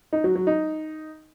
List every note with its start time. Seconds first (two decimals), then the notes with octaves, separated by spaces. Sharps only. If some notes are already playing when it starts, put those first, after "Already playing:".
0.13 D#4
0.24 F#3
0.35 F#3
0.47 D#4